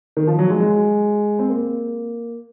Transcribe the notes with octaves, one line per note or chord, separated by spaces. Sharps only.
D#3
F3
F#3
G#3
G#3
C4
A#3